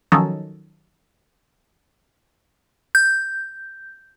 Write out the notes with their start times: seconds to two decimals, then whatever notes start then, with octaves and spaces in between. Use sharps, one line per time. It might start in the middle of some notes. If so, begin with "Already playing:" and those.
0.12 D#3 F3 F#3 C#4 D#4 A4
2.95 G6